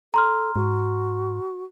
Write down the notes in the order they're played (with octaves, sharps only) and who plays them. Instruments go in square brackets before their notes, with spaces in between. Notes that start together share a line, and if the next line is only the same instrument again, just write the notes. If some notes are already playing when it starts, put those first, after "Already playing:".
[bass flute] A4 [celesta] A#5 C6 F6
[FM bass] G#2 [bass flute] F#4